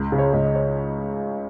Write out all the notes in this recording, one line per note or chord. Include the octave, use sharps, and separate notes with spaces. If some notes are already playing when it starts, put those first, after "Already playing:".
Already playing: C#2
C#3
C#5
C#2 D#5
D#5
C#5